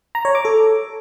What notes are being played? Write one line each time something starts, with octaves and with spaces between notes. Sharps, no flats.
A#5
C#5
D6
A4